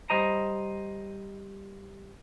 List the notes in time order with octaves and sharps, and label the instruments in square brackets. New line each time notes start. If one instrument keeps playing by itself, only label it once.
[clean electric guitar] G3 C5 D#5 A#5